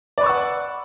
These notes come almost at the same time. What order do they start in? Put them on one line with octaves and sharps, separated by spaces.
D5 B4 C#6 E6 F#5